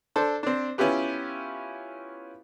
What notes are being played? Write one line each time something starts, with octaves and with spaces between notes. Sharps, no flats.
D4 A4 C5
C4 D4
B3 C#4 E4 F4 G4 B4